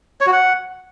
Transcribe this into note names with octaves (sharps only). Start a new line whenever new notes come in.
C#5
F#4
F#5